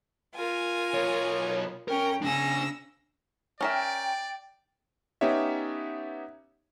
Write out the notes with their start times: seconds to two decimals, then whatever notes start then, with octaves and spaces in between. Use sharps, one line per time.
0.35 F4 A#4 G#5
0.94 B1 C#5
1.88 C#4 A#4 G5
2.22 C#3 D4 G#5 E6 A#6
3.61 C#4 A#4 D5 E5 G5
5.21 B3 C#4 D#4 G4 C#5 E5